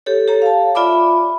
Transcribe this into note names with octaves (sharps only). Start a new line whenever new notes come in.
G4 A4 C#5
G4 A4 C#5 A#5
F5 A5
F4 D5 E5 B5 D6